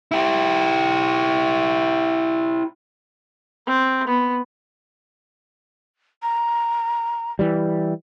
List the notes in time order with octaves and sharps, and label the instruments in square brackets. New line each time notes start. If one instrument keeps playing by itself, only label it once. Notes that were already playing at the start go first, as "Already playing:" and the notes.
[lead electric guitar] E4 G4
[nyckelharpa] C4
B3
[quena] A#5
[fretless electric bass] E3 G3